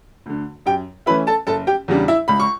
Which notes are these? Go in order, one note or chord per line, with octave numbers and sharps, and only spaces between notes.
D2 D3
F#2 G4 G5
E3 A3 C#4 E4 B4 B5
A4 A5
F#1 A4 A5
G4 G5
E2 C#3 G3 D4
E4 E5
C#2 B5
C#6